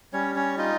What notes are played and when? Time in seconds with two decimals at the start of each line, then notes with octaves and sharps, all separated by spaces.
0.13 G3 C#4 C#5
0.36 C#4 C#5
0.58 D#4 F4 D#5